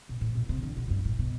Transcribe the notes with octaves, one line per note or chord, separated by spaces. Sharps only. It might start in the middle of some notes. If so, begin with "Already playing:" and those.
B2
A2
B2
C3
D3
B2
F#2
G2
A2
B2